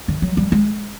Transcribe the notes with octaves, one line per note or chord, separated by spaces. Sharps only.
D3
F#3
G3
G#3